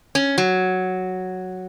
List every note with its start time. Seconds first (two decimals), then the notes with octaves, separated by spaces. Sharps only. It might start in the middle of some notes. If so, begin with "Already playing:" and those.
0.15 C#4
0.38 F#3